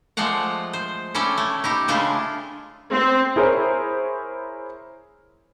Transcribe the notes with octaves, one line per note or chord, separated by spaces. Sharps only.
F3 G#3 A3 D5 F5 F#5
C5
C#4 E4 A4 D5 G5
A3
D#4 E4 G4
C#3 G#3 A3 D4 E4 F4
C4
E4 G#4 A#4 C5 C#5